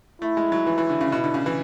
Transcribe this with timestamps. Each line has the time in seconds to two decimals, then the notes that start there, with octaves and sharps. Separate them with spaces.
0.22 A3 E4
0.37 G#3
0.52 F#3
0.67 E3
0.78 E3
0.89 D3
1.01 C#3
1.12 B2
1.24 D3
1.34 C#3
1.46 E3